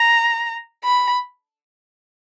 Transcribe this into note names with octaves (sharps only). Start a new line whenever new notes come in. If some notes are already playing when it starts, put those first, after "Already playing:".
Already playing: A#5
B5